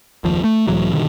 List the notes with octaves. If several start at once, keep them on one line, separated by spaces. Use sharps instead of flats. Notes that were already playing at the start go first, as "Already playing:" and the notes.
F#1 D#2 F3
A3
C#2 A2 E3 F#3
G2 B2 D3 D#3